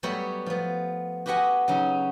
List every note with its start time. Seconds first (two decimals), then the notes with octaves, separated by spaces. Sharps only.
0.03 F#3 G3 A3 B3 B4 C#5
0.46 F3 B3
1.26 F#4 G4 B4 D#5 F#5 G#5
1.68 C#3 F#3 C#4 D#4